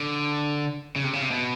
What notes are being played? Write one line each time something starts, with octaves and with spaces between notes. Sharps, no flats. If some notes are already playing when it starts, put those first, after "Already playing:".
Already playing: D3
C#3
C3
C#3
C3
B2